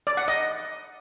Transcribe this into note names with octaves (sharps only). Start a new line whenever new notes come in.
D5
F#5
D#5